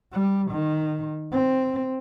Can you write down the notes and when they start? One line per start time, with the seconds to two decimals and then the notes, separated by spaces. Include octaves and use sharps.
0.12 G3
0.51 D#3
1.32 C4